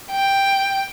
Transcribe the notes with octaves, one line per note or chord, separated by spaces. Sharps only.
G5